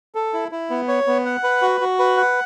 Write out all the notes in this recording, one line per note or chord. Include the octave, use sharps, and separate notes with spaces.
A4
E4
E4
B3
C#5
B3
F#5
B4
F#4
F#4
B4
F#5